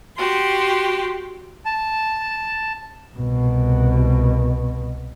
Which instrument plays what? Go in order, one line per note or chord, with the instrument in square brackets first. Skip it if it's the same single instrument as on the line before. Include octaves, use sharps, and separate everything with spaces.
[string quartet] F#4 G4 C6
[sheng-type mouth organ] A5
[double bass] C2 B2